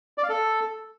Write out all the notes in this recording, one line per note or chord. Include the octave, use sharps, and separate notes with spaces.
D5
F5
A4